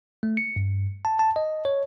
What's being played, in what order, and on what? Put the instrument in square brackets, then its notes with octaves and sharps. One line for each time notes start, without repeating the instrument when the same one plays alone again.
[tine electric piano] A3
C#7
G2
A5
A5
D#5
C#5